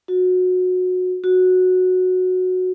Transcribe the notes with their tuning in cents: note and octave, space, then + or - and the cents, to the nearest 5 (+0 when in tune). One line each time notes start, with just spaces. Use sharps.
F#4 -20
F#4 -10